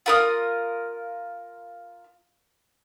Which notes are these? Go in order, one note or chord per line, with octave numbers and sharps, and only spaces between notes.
F4 A#4 D#6